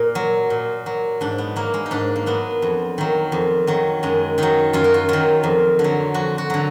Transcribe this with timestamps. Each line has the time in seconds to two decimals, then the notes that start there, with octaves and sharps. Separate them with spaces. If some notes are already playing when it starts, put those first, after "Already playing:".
Already playing: A#2 A#4
0.15 F#3
0.50 A#2
0.86 F#3
1.21 G#2 D4
1.38 B3
1.56 F#3 A#3
1.74 G#3
1.86 D#4
1.91 G#2 D4
2.16 A#3
2.26 F#3 B3
2.62 F2
2.98 D#3 F#3
3.32 F2
3.67 D#3 F#3
4.03 F#2 G#3
4.38 D#3 F#3 D#4
4.73 F#2 F4
4.84 F#4
4.94 F4
5.09 D#3 F#3 F4
5.44 F2
5.79 D3
5.84 F#3
6.14 F2 F#4
6.38 F#4
6.50 D3 F#3